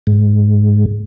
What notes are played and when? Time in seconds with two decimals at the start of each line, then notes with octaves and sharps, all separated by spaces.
0.07 G#2